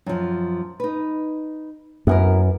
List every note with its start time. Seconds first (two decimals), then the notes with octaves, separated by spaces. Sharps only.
0.06 F#2 F3
0.80 D#4 B4
2.07 F#2 B3 E4 A#4